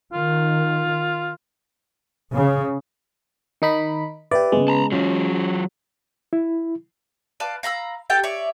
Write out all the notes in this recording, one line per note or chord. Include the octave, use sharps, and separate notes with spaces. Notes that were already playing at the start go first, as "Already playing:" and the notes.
D#3 F4
C#3
D#3 D#4 B5
G4 B4 D5 E5
C#3 G#3 B3
A5 A#5
F#3 C#4 F4
E4
B4 D5 F5 A5
F5 A#5 B5 E6
G4 A4 G5 A5
C#5 D5 E5